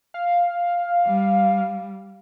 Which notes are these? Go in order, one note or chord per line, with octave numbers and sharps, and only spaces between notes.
F5
G3